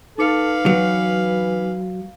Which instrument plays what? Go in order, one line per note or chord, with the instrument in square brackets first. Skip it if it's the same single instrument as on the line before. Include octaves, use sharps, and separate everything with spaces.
[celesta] D#4 D6 C#7 [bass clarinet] A4 [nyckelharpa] B4 F5
[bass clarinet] E3 [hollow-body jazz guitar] F#3